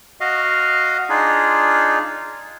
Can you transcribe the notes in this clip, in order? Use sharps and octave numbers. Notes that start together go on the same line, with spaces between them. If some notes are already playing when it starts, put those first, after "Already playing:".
F#4 D#5 F5
D4 D#4 F4 G#4